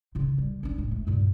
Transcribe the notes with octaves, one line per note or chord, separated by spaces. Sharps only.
C#3 F4
G3
C#4 D4
A2 G#3
A3
G2 A#2